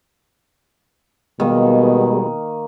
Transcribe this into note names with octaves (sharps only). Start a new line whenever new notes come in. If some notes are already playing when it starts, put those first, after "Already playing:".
B2 D#3 G3 G#3 A#3 B3